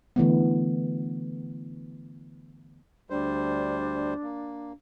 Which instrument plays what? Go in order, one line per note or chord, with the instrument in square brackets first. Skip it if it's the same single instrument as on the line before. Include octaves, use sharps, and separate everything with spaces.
[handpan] D3 E3 A3 B3
[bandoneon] D2 G3 C5 [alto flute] D4
[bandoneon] A#3